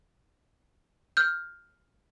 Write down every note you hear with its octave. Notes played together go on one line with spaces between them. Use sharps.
F6 G6